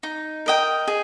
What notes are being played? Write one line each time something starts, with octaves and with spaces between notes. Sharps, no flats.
D#4
A#4 D#5 G5
G#4